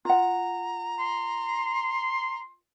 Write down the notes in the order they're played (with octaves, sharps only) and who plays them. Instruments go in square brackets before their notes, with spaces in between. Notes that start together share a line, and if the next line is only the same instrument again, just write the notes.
[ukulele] F4 F#5 [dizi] A#5
[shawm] C6